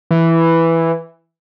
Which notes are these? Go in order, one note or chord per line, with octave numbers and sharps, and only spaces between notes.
E3